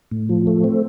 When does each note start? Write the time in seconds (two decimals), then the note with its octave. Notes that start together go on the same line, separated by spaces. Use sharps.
0.11 A2
0.29 F3
0.47 A3
0.64 C4